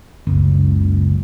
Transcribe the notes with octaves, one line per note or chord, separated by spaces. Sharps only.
F#1 C#2